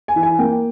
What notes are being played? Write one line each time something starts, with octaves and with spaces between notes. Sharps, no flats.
G#5
E3
G#5
A#3 G5